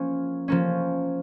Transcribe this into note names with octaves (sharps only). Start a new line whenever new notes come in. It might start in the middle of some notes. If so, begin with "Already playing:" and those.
Already playing: F3 A#3 C#4
F3 A#3 C#4